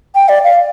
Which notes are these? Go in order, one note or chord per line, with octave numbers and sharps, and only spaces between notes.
G5
D5
F5